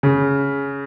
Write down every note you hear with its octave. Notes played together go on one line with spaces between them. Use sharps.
C#3